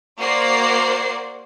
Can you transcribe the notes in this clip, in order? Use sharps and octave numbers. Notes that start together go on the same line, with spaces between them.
A#3 F#4 C5 D5 C7